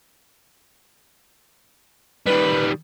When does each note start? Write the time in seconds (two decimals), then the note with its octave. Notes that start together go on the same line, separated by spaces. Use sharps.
2.26 D#3 G3 B4